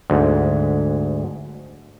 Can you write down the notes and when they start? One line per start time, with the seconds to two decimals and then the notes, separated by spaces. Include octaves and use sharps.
0.10 D2 G#2